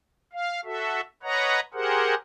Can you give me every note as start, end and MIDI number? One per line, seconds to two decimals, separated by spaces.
0.33 0.61 77
0.65 1.01 66
0.65 1.01 69
0.65 1.01 76
1.23 1.60 71
1.23 1.60 73
1.23 1.60 75
1.23 1.60 78
1.23 1.60 82
1.74 2.15 67
1.74 2.15 68
1.74 2.15 70
1.74 2.15 72
1.74 2.15 78